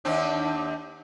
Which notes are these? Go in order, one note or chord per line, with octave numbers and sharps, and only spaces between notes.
D#2 C4 D4